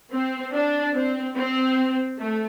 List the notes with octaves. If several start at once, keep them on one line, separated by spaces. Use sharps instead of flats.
C4
D4
C4
C4
A3